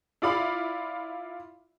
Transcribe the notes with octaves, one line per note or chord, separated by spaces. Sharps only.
E4 F4 D5 F5 B5